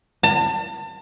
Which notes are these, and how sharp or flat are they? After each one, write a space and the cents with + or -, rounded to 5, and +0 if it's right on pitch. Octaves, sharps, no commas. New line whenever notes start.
A5 +35